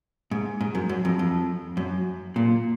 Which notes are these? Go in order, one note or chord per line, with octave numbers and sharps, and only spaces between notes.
G#2
G#2
F#2
F#2
F2
F2
F#2
A#2